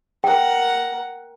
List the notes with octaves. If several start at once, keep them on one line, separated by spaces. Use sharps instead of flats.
A#4 F#5 G5